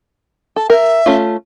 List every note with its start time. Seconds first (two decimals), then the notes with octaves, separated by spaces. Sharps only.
0.56 A4 A5
0.70 A#4 E5
1.06 A3 C#4 F4